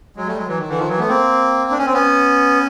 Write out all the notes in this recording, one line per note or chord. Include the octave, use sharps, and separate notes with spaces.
F#3 G#3
G3 A3
F#3 G#3
E3 F#3
D#3
D3 E3
D#3 F3
E3 F#3
A3 B3
A#3 C4
D4
C#4
C4
B3 C#4